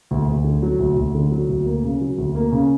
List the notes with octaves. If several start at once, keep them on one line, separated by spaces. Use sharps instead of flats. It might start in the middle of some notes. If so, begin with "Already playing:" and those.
D2
D2
D3
F#3
D2
D2
D3
F#3
D2
A#3
C#3
F#3
D2
A#3
C#3